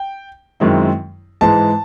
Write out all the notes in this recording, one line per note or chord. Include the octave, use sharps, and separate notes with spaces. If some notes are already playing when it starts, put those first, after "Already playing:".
Already playing: G5
F#2 D#3 G#3 C4 E4
G#2 E3 G#3 A5